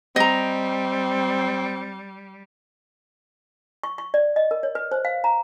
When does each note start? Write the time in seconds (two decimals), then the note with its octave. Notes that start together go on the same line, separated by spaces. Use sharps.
0.16 G3 C4 D#5 A#5
3.83 C#6
3.98 C#6
4.14 D5
4.36 D#5
4.51 A#4
4.63 C#5
4.75 B4
4.92 C5
5.05 F5
5.24 A#5